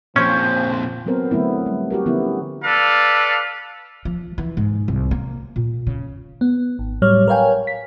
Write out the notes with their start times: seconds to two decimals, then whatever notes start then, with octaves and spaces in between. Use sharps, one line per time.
0.16 F2 A#2 F3 C#4 C5 C#5 G5
1.06 F#3 B3 C4 A#4 C5
1.31 D3 F#3 A3 B3 E4
1.66 G3
1.90 F#4 G4 A#4
2.06 D3 F3 B3 C#4 E4
2.64 A4 B4 D5 F5
4.05 F3
4.38 E3
4.57 G#2
4.88 C2
5.11 A#3
5.56 A#2
5.87 C#3
6.41 B3
6.79 G#1
7.02 A2 F#3 G3 C#5 F6
7.28 A#4 B4 C#5 F5 G5 G#5
7.67 B6